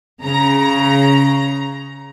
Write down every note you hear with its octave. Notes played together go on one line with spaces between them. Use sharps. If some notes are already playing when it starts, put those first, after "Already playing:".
C#3 A#5